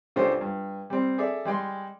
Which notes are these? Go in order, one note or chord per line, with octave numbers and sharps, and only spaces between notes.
C#2 C#3 D4 G4 A4 C5
G2
G3 C4
G#4 A4 D5 E5
G3 G#3 G5 C6